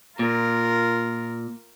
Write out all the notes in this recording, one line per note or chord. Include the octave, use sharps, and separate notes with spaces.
A#2 F4 A#4